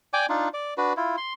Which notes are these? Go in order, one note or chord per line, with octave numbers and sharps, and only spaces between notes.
D5 G5 G#5 D6
D4 D#4 F4
D5
D4 F#4 B4
E4 F4
C6